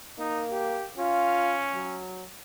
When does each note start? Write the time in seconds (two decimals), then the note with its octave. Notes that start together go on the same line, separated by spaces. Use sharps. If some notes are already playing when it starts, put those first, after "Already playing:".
0.18 A#3 D#4
0.51 G4
0.97 C#4 F4
1.74 F#3